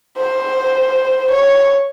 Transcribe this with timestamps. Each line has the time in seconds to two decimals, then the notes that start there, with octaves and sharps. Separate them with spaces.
0.17 C5
1.32 C#5